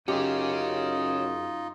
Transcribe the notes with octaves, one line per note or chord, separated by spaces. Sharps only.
F#2 C#4 D#4 F4 G4 G#4 D#5